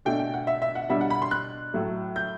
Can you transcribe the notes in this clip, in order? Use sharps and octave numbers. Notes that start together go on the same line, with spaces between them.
B2 A3 D4 G5
G5
F#5
E5
E5
F#5
B2 G3 D4 E5
F#5
B5
C6
F#6
A2 F#3 A3
G6